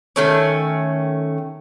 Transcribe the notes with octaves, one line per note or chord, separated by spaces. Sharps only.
D#3 A3 C#4